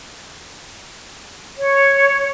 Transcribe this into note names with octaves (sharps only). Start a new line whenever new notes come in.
C#5